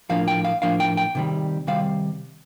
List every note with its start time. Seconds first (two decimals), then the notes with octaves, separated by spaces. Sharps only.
0.09 A2 F3 A#3 D4 F5
0.28 G5
0.45 F5
0.62 A2 F3 A#3 D4 F5
0.80 G5
0.97 G5
1.15 C3 D#3 G3
1.67 C3 D#3 G3 F5